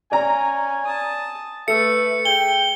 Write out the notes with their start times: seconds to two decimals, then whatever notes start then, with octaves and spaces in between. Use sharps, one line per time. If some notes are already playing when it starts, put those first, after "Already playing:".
0.12 C#4 D5 G#5 A#5
0.85 A5 D#6
1.68 A3 A4 B4 E5 C#7
2.25 G#4 G5 G7